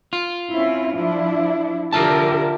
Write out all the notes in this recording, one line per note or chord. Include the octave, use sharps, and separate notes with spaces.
F4
C4 C#4 E4
F3 D4 E4
D3 F4 G4 A#4 E5 A5